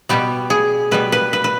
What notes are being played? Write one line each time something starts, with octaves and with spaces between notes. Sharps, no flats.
B2 G3 B3 G4
G#4
B2 G3 B3 B4
B4
B4
B4